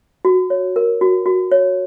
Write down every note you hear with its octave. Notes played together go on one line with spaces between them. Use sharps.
F#4
C#5
A#4
F#4
F#4
C#5